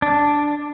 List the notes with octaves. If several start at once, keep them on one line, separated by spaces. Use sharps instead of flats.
D4